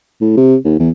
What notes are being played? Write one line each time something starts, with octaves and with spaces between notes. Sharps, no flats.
A2
C3
D#2
E2